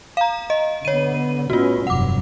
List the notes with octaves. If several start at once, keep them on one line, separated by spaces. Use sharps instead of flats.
F5 A#5
D#5
D3 B3 C#5 D#7
A2 B3 C#4 F4 F#4
F1 G2 F#3 F#5 D6